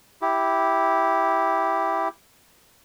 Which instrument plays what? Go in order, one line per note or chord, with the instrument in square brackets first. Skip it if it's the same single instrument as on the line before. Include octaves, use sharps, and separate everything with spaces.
[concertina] E4 G4